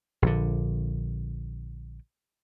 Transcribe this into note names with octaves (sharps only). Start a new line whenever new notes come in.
A#1 D3